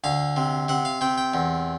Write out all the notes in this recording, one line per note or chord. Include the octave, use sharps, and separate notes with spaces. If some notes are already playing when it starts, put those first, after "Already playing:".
D2 F5
C3
C3 F#5
F5
C3 G5
G5
E2